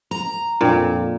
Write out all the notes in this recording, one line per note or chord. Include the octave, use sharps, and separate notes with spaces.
A#5
F2 A#2 D4 E4 G5